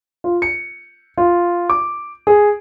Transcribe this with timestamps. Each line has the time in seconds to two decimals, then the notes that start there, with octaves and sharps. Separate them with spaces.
0.24 F4
0.42 C#7
1.18 F4
1.70 D6
2.27 G#4